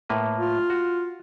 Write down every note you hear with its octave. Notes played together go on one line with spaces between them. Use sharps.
A2 A#3 B4
F4
F#4